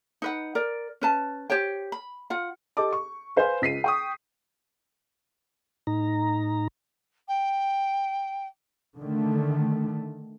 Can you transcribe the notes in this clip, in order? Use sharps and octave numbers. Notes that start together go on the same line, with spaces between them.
D#4 B4 F#5
A#4 D5
C#4 B4 A5
G4 C5 C#5 G5
B5
F4 F#5
G4 A4 D#5 A5 D6
C#6
B4 C5 F5 G#5 C6
C#2 B6 C7 D#7
G5 C#6 D#6
A2 D#4 A#5
G5
D3 D#3 A3